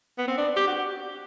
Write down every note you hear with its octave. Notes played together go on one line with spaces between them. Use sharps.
B3
C4
D4
G4
F#4